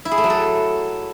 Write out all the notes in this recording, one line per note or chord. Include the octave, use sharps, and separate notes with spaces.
E4
G#4
A3
F#3
A4